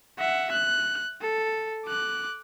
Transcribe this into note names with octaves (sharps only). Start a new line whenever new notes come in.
E5 F#5
F#6
A4
D6 F#6